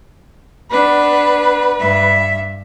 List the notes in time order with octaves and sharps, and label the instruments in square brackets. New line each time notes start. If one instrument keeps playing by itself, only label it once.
[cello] B3 D4 [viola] B4
[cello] G2 E5